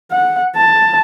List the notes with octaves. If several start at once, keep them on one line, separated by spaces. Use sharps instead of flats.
F#5
A5